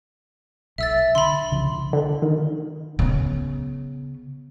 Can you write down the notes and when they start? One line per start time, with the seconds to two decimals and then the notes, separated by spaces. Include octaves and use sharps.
0.78 B1 E5 E6 A6
1.15 D3 B5 C6
1.51 C2 C#3 F3
1.93 D3
2.22 D#3
2.99 C#3 B3